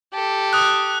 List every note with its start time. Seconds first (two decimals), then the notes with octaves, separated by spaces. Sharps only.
0.13 G4 A4
0.53 D#6 F#6